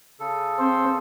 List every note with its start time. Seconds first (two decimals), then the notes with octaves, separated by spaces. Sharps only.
0.20 C#3 A4
0.59 C4 C5